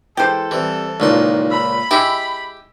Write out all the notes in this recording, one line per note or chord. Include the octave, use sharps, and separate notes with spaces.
E3 G#3 G4 A4 C5
E3 G3 C4
C#2 A#2 D#3 E3 D#4 C6
B5 E6
G#3 E4 G4